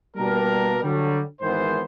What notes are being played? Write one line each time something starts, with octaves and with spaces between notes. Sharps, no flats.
B2 G3 A#3 D4 G4 A#4
D3 F#3 G3
G#1 G#2 E3 B3 A#4 C5